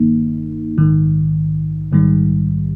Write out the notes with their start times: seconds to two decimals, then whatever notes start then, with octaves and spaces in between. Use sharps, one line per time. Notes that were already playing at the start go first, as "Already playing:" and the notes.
Already playing: G1 G2 D#3 A#3 D#4
0.78 A#1 G#2 D#3
1.92 A#1 G#2 D#3 G3